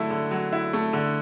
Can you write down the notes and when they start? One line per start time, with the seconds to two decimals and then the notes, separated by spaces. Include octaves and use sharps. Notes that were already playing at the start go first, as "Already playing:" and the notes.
Already playing: D3 F#3 A3 E4
0.10 D3
0.31 F#3
0.53 E4
0.73 A3
0.93 D3